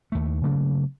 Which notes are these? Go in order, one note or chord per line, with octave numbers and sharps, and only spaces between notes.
D#2 A3
C#3 F#3 A3 A#3